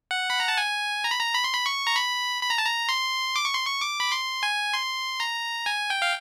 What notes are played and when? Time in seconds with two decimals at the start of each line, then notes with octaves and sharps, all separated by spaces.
0.11 F#5
0.30 B5
0.40 A#5
0.48 A5
0.57 G#5
1.04 A#5
1.11 B5
1.19 A#5
1.34 B5
1.44 C6
1.54 B5
1.66 C#6
1.87 A#5
1.96 B5
2.43 B5
2.50 A#5
2.58 A5
2.66 A#5
2.89 C6
3.36 D6
3.45 C#6
3.55 C6
3.65 C#6
3.81 D6
4.00 B5
4.12 C6
4.43 G#5
4.73 C6
5.20 A#5
5.66 G#5
5.90 G5
6.02 F5